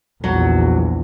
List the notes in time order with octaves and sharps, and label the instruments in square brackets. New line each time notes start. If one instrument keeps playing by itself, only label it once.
[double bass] A#1 E2 [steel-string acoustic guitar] F#3